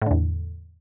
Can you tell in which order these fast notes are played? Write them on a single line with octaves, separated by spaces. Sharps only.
A2 D3 E2